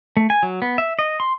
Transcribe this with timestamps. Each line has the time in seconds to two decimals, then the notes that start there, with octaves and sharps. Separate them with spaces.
0.17 A3
0.30 G#5
0.43 F#3
0.62 B3
0.78 E5
0.99 D#5
1.20 C6